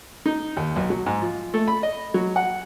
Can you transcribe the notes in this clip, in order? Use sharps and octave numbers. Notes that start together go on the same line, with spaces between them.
D#4
D#2
B1
F#3
G#2
F3
A3
B5
D#5
F#3
F#5